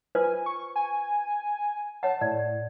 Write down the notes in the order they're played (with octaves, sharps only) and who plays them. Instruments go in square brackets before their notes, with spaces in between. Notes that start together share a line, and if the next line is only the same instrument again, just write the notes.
[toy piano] F4 B4 C5 [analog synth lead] G#5
[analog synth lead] C#6
G#5
[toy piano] C#5 F#5 [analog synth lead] A5
[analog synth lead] A2 [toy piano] D5